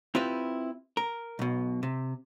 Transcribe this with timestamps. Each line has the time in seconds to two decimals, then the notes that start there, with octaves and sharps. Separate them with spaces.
0.15 C4 E4 F4 G4 B4
0.97 A#4
1.39 B1 B2
1.83 C3